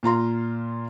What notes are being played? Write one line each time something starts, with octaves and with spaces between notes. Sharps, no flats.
A#2 F4 A#5 C6